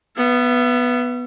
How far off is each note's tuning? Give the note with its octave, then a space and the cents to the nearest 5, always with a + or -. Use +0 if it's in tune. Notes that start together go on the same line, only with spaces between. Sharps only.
B3 +0 E5 +40